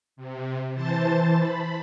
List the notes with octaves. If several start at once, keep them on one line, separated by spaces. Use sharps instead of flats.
C3
E3 C5 A5 A6
B5